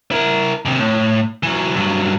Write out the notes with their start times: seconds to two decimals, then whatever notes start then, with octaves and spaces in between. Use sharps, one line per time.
0.12 E4 A#4
0.65 D#2 C3
0.79 A2
1.43 E3 F#3
1.76 G2 F#3